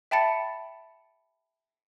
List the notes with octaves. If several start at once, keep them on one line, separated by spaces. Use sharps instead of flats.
E5 G5 A5 B5 A6 C#7